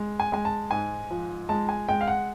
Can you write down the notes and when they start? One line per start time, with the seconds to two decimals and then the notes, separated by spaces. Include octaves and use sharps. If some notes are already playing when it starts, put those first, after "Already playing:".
Already playing: G#3
0.20 G#5
0.32 G#3 G#5
0.45 A5
0.71 G#2 G#5
1.11 F3
1.49 G#3 A5
1.69 G#5
1.88 G#3 G5
2.01 F5
2.08 F#5